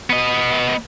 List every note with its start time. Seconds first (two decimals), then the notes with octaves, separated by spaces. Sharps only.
0.10 B3 D#5